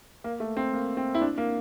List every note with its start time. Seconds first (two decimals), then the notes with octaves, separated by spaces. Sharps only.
0.24 A#3
0.40 A3
0.57 C4
0.73 A#3
0.97 C4
1.14 E4
1.21 D4
1.38 A#3